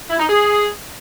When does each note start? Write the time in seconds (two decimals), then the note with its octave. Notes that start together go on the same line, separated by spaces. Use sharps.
0.10 E4
0.20 D#4
0.29 G#4